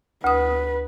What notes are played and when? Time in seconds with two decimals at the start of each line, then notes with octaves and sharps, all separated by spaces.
0.24 D2 B4 D#6